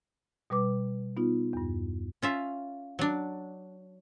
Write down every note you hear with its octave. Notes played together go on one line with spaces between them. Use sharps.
B2 G3 B4 D6
B3 D#4 F4
E2 G2
C#4 F4 E5
F#3 D4